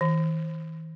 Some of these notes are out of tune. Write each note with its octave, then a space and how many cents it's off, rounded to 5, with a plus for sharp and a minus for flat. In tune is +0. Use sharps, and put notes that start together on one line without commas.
E3 -45